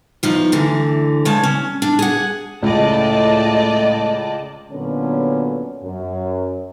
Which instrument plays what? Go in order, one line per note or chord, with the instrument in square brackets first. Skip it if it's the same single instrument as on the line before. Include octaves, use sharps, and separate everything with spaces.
[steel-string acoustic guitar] E2 F3 D#4
D2 D3 E3
C#3 G#3 C#5 A5
C#4
D4
G#4 F#5
[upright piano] C#2 [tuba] A2 [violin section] D5 D#5 A5
[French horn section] A#2 D3 F#3 B3 C#4
F#2